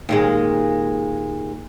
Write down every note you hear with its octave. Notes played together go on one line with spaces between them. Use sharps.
D#2 A#2 G#3